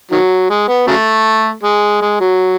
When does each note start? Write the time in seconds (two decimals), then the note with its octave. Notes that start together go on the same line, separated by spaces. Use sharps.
0.11 D#3 F#3
0.50 G#3
0.68 B3
0.87 C#3 F#3 A3
1.63 G#3
2.01 G#3
2.20 F#3